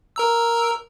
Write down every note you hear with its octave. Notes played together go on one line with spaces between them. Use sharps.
A#4 A#5 E6